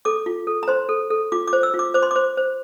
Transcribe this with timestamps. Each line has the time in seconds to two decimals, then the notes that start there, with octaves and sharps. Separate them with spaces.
0.05 A4 D6
0.26 F4
0.47 A4
0.63 A#5
0.68 C5 C6
0.89 A4
1.10 A4
1.32 F4 D6
1.48 D6
1.53 C5
1.63 E6
1.74 F4
1.79 D6
1.94 C5 D6
2.03 C6
2.11 C5 D6
2.37 C5